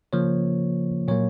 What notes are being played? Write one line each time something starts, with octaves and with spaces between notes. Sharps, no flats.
C#3 F3 A#3 C#5
A#2 F#3 A#3 C#5